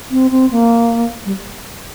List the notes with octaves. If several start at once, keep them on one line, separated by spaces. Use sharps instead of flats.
C4
C4
A#3
G3